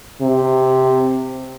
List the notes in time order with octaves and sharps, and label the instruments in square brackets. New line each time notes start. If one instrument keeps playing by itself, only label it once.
[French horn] C3